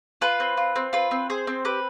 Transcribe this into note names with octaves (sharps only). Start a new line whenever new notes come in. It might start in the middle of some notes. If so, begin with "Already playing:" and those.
F4 B4
C4
F4
C4
F4 B4
C4
G#4 C5
C4
G4 B4